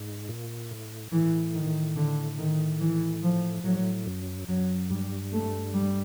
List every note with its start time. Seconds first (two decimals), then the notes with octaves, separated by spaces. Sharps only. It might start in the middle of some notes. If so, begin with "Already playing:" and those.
Already playing: G#2
0.29 A#2
0.71 A2
1.12 A2 E3
1.54 D#3
1.96 D3
2.38 D#3
2.80 E3
3.23 F3
3.63 A2 F#3
4.06 F#2
4.48 F#2 F#3
4.90 G2 G3
5.32 A3
5.74 G3